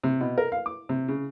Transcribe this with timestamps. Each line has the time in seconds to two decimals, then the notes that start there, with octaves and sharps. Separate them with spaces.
0.04 C3
0.21 B2
0.38 A#4
0.52 F5
0.66 D6
0.89 C3
1.08 C#3